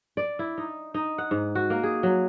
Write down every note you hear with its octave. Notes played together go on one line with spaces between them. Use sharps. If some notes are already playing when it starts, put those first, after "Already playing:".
D5
E4
D#4
D#4
F#5
G#2
F#4
A#3
G#4
F#3